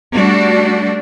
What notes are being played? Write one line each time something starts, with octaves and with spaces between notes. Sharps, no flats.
G3 A3 D4 F#4